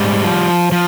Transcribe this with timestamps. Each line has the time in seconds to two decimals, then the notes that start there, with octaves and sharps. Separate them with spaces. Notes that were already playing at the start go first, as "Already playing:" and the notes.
Already playing: G#2 G3
0.24 F3
0.72 F3